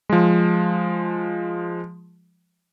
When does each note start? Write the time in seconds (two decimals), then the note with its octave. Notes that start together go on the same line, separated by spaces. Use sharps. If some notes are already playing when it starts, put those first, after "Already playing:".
0.09 F3 G#3